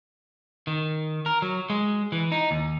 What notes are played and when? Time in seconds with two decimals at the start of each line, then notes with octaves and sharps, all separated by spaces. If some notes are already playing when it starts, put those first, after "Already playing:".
0.67 D#3
1.26 A#4
1.42 F#3
1.70 G#3
2.12 E3
2.32 D#4
2.51 D#2